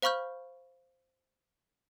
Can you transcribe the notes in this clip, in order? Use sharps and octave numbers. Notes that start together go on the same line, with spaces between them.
C5 F5 B5 C#6 F6 G6